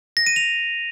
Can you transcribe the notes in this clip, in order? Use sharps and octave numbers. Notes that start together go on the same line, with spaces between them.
A#6
D#7
F7